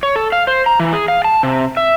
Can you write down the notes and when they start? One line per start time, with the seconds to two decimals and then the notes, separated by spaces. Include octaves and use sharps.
0.03 C#5
0.16 A4
0.32 F5
0.47 C5
0.66 A#5
0.80 E3
0.93 G#4
1.08 F5
1.24 A5
1.43 C3
1.77 E5